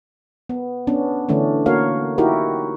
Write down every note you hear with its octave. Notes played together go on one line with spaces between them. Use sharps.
B3
B3 C#4 D4
D3 E3 A3 C#4 D4
A#3 F#4 A#4 C#5 F5
D#4 E4 F#4 G4 A#4